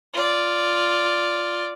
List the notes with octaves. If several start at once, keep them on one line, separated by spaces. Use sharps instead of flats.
F4 D5